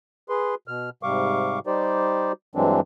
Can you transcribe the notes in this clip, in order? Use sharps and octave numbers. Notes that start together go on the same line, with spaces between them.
G#4 B4 C6
B2 F6
G#2 C3 G3 F5 C#6 D6
G3 D#4 G4 C5 D5
G2 E3 F#3 G#3 C4 D4